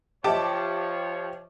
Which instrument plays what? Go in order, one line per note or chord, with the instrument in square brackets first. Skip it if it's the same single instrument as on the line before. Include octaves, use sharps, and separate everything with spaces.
[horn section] F3 C#5 [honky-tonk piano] G4 A5 D6 [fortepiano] D#5 E5